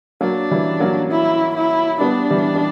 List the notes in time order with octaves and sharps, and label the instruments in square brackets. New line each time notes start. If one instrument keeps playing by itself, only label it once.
[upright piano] F#3 A#3 [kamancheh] D4
[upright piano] E3 G3
F#3 A#3
[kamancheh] E4
E4
[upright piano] G3 B3 [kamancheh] D4
[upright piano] E3 G3
G3